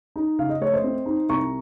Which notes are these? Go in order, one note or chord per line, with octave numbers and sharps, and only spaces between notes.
D#4
C#3 F5
D#5
A3 C#5
C5 D#5
C4
D#4
C2 A#5 C#6